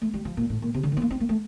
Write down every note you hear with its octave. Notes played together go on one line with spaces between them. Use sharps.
A3
G3
F3
A#2
A2
A#2
C3
D3
D#3
C4
A#3
C4
A#3
A3